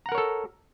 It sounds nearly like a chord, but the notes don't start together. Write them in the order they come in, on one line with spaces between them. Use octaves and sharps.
A#5 F#5 A#4 C#5 A4